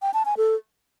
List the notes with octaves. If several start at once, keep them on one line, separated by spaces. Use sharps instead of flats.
G5
A5
G#5
A4